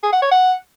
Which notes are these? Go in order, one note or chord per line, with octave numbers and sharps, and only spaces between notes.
G#4
F#5
C#5
F#5